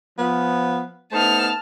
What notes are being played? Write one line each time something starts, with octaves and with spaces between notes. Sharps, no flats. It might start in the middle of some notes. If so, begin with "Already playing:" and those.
F3 B3
A3 B3 D#4 C5 A5 F6